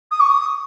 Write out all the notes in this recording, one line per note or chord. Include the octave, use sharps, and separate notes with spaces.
D#6
C#6
D#6